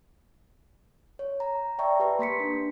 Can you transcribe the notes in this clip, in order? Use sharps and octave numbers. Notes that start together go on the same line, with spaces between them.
C#5
A#5
D5 E5 G5 A5 A#5 C#6
G4 B4
A#3 C6 B6 C#7
D4